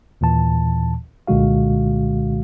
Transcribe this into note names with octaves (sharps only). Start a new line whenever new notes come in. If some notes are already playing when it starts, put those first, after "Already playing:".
D#2 A#2 E3 A5
C2 A#2 D3 G#3 F#4 F5